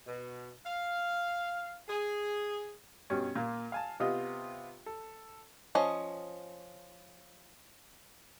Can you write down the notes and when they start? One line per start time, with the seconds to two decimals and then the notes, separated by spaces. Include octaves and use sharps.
0.07 B2
0.65 F5
1.88 G#4
3.10 G2 B2 C#4
3.36 A#2 A#3 F4
3.72 F5 G#5 A5
4.00 C3 B3 F4 D#5
4.86 A4
5.75 F3 C#4 D#5